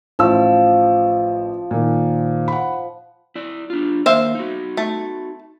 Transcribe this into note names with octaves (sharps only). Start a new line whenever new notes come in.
A1 F3 E6
A#2 D#3
F#5 B5
E4 D5
D4 F4
D#3 A#3 C5 E5 F5
D#4 F#4
A3